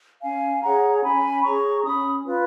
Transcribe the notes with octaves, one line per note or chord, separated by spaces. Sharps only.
C#4 F5 G#5
G#4 C#5 F#5 A#5
C#4 G#5 B5
G#4 C#5 A#5 C#6
C#4 B5 D#6
F4 B4